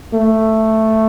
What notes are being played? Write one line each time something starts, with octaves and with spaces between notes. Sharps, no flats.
A3